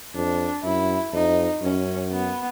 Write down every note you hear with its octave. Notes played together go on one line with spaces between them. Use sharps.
F2 D4
F#2 E4
F2 D#4
F#2 C#4
B3